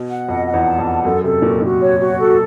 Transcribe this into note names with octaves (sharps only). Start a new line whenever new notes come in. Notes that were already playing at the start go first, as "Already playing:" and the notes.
Already playing: B2
F#5
F2 D#5
F#5
E2
A5
F2
F#5
F#2 A4
C3 A4
A#2 F#4
A#2 F#4
C#5
F#4
A4